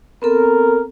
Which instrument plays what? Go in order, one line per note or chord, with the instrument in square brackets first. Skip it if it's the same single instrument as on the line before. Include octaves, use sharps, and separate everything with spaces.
[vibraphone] B3 C4 A4 [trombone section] A#4